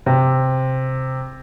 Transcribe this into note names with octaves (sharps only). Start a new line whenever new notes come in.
C3